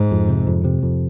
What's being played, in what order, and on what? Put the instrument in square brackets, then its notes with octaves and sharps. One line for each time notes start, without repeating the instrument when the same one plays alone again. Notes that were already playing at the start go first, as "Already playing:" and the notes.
Already playing: [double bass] G#2
[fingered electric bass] F2
C3
F2
C3
F2